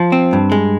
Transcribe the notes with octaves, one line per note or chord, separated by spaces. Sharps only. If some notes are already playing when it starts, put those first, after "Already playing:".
Already playing: F3
C4
G2
G#3